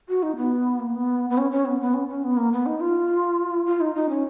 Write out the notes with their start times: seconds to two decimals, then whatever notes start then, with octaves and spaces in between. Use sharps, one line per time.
0.09 F#4
0.23 D#4
0.37 B3
0.80 A#3
0.95 B3
1.30 B3
1.38 C#4
1.51 C#4
1.66 B3
1.81 B3
1.94 C#4
2.09 C#4
2.24 B3
2.37 A#3
2.53 B3
2.66 D#4
2.81 F4
3.66 F4
3.81 D#4
3.95 D#4
4.09 C#4